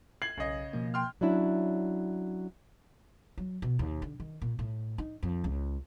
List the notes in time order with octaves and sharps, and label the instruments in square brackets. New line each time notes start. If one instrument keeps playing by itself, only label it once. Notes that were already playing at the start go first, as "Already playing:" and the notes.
[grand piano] G#6 C7 F#7
[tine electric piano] B1 [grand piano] C#3 D#5
[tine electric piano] B2 F3 A#3
[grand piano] G5 C6 F6
[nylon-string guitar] F#3 C#4 D4 E4
[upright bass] F#3
B2
D#2
D3
D#3
A#2
A2
D#4
F2
C#2